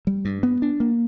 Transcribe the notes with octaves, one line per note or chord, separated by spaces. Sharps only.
G3
G2
B3
D4
A#3